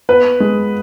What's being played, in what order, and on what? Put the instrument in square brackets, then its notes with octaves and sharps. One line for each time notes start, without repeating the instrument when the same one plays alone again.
[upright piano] B3 B4
G#3